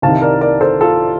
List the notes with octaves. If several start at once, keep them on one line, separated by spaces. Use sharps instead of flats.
C2 C3 D#3 F5 A5
A#4 D5
A#4 D5
A4 C5
F4 A4